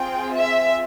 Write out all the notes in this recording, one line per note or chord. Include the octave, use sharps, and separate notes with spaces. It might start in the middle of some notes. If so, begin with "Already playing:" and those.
Already playing: C4 F4 G#4 G5
E5